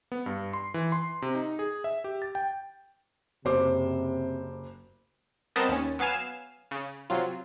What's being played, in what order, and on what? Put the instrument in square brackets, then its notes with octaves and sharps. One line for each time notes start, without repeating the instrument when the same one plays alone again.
[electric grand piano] B3
G2
C6
E3
C6
C3
D#4
G#4
E5
G4
A6
G5
[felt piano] F#1 C5 D6 [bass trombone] C3
[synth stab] G3 B3 C4 A#4 D#5 A5
D#2 C#4
F#3 B3 F5 G#5 E7
C#3
C3 F#3 F4